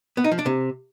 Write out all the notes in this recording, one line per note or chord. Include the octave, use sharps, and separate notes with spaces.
B3
D#4
F3
D4
C3